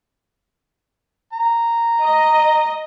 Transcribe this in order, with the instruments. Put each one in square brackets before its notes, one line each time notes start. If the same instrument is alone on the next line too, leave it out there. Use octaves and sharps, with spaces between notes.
[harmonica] A#5
[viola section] D#5